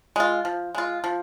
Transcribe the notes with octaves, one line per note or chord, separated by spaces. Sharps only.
G#3 F4
F3
G#3 F4
F3